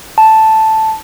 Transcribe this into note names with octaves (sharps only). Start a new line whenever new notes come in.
A5